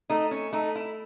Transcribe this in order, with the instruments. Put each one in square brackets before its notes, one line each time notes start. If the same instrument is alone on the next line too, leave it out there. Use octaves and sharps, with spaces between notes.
[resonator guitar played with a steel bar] A3 D#4
C#4
A3 D#4
E4